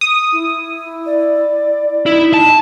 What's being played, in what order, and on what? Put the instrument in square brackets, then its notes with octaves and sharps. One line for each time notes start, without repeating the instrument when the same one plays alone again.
[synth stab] D#6
[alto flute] E4
[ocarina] D5
[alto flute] D#4 [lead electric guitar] E4
[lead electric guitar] A5